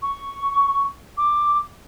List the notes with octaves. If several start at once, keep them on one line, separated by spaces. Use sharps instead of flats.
C#6
D6